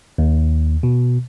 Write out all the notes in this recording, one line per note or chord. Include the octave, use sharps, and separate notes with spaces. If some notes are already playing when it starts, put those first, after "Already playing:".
D#2
B2